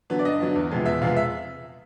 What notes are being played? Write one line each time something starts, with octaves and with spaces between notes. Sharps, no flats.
D3 F#3 B3
D5
G2 D#5
D3 F#3 B3
E2
C3 F3 G#3 B3
E2 E5
C3 F3 G#3 B3 F5
E5